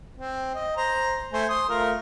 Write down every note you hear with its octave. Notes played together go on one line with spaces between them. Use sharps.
C4
D#5
C5 A#5
A3 C5 G#5
C6 D#6
A3 F4 A#4